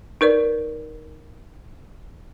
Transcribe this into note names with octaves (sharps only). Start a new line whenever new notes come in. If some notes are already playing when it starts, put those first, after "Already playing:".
D#4 A#4 B4 D5